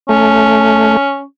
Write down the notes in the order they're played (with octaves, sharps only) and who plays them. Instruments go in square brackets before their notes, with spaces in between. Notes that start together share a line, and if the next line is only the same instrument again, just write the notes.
[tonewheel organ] A3 [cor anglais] C#4